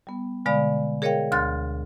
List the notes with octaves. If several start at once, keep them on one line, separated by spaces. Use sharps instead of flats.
G3 B3
B2 D3 G#3 D5 F5 B5
G#4 A#4 C#5 D#5 F5 G5
D2 C6 F6 F#6 A6